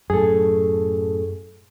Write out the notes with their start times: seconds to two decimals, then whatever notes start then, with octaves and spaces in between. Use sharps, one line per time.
0.10 F#2 A2 G#4 A4